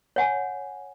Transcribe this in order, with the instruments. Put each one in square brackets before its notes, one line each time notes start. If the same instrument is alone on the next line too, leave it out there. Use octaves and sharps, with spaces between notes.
[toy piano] C#5 F#5 G#5